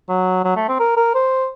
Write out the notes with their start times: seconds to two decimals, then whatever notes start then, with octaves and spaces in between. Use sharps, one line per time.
0.09 F#3
0.44 F#3
0.56 A3
0.68 C4
0.79 A#4
0.97 A#4
1.14 C5